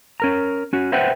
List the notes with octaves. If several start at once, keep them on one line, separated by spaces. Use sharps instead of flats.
C#4 A#4 A#5
C#4 F#4
B4 C5 E5 F#5 G5